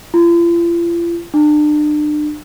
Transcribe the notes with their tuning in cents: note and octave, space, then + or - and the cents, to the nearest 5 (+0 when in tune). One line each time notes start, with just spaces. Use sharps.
F4 -45
D4 +35